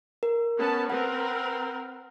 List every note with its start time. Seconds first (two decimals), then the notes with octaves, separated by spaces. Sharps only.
0.23 A#4
0.58 B3 C#4 A5
0.90 C4 A#4 B4 F#5